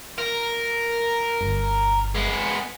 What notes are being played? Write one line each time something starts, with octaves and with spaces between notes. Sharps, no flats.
A#4
G1
G#3 B3